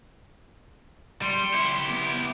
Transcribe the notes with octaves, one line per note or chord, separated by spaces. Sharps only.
G3 C6 C#7
E4 G4
B3